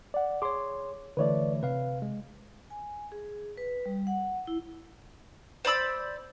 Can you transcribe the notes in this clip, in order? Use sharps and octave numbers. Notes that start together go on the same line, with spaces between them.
D5 F#5
G#4 C#5 C6 D6
D3 E3 A3 B4 C#5 D5
C3 B4 F5
G#3
G#5
G#4
B4
G3
F#5
E4
C5 D5 B5 E6